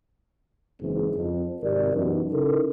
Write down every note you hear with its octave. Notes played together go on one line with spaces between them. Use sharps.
F#1 G#2 E3 C4 G#4
F2
G#1 C3 G4 A#4 D5
F#2 B2 E3 D#4
C#3 D#4 E4 A4 A#4